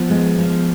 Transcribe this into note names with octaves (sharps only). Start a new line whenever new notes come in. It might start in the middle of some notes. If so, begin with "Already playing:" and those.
Already playing: F3 B3
G#3
F3